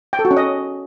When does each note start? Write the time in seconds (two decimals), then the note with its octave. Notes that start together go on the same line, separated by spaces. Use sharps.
0.13 G5
0.19 A4
0.25 F#4
0.31 C#4
0.37 D#5